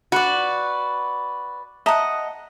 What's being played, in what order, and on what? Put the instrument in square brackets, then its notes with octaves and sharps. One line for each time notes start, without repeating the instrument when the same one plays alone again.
[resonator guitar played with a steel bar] F#4 [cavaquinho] B4 D5
[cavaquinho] D#5 F#5 [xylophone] E5 A5 A#5